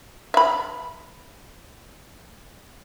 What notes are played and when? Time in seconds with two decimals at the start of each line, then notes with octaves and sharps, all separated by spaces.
0.34 E5 B5